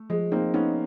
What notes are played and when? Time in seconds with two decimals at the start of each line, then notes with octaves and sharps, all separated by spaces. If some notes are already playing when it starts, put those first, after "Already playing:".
Already playing: A3
0.10 F3 G#3
0.32 A#3 C4 D#4
0.54 B3 C#4 D#4